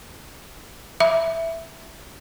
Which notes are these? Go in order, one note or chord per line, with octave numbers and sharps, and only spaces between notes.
E5